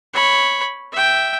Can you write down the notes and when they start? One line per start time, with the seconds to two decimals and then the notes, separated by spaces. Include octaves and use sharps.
0.14 C#5 B5
0.92 E5 G5